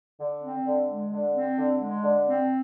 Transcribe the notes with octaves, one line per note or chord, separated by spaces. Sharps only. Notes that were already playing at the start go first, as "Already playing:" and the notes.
D3
C4
D3
G#3
D3
C4
D3
G#3
D3
C4